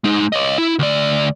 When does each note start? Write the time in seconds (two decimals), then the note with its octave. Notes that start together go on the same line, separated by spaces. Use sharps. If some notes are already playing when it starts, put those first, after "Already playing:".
0.04 G#3 D#4
0.32 C#5 D#5
0.58 E4
0.79 D2 D5